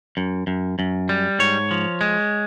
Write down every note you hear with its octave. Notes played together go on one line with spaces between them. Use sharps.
F#2
F#2
F#2
G3
G#2 C#5
F3
G#3